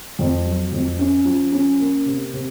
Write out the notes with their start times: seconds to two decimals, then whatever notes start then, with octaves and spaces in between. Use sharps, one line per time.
0.19 F2
0.45 F#3
0.72 F2
0.99 C#4
1.25 F3
1.52 C#4
1.79 A#3
2.06 C3
2.33 C3